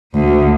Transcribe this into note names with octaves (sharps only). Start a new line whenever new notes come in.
D2